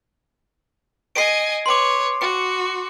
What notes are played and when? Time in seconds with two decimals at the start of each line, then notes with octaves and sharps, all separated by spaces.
1.15 D#5 G#5 C7 D7
1.66 B4 C#5 C6 D6
2.21 F#4 C#7